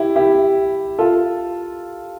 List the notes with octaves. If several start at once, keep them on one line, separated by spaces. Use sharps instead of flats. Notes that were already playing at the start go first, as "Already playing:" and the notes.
Already playing: E4 G4
E4 G4
F4 A4